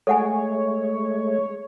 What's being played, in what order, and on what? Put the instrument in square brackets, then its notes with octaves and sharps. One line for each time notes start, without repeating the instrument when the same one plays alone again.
[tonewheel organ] G#3 A3 [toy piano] A4 F#5 G#5 [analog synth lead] C#5